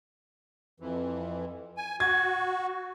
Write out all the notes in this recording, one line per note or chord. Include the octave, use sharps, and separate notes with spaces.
F2 E3
G#5
F#4 G#6